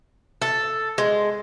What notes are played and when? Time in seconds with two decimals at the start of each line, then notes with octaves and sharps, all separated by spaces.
0.42 A4
0.98 G#3